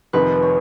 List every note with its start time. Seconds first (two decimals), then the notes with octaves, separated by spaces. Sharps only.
0.13 F1 F2 D#3 B4
0.43 C#5